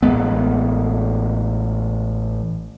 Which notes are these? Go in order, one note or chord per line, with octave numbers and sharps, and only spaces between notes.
A1 G#3 B3